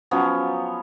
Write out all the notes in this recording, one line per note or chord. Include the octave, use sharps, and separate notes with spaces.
F3 F#3 B3 C#4